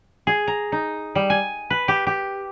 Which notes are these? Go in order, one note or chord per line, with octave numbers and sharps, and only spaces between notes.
G#4
A#5
D#4
G3
G#5
B4
G4
G4